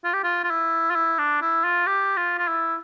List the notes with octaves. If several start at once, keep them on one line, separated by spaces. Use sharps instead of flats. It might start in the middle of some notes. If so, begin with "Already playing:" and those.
F4
G4
F4
F4
E4
F4
E4
D4
E4
F4
G4
F4
F4
E4